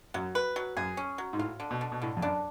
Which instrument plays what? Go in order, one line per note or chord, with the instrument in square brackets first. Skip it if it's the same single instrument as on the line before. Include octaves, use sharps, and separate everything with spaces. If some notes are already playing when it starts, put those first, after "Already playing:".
[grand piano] F#2 [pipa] F#3
[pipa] B4
F#3
[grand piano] F#2 [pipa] G#4
[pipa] C#4
F#3
[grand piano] G#2
[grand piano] A2 [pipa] F4
[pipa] D3
[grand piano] B2
[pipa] D3
[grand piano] B2
[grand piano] A2 [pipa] D3
[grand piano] F2
[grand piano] F#2 [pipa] D4